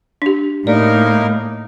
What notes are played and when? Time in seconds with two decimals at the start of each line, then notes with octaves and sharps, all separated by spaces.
0.22 D4 G4
0.67 A2 A#3 D#4 A#4 D5